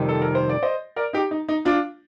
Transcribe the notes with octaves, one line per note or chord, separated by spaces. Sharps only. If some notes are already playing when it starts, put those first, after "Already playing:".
Already playing: F2 C3 D#3 G3 C4
A4
A#4
C5
D5
C5 D#5
A#4 D5
D#4 G4
D#4
D#4
D4 F4